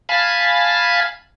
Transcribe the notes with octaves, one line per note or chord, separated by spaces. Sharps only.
F5 G#5 A5 B5